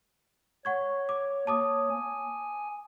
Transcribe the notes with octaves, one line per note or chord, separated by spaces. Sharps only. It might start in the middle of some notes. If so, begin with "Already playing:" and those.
C#5 F#5 C#6 G#6
D6
A#3 C#5 A5 D6 D#6
G#5